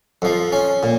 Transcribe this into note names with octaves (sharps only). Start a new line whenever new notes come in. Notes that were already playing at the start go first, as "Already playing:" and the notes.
F2 F3
C#4
A#2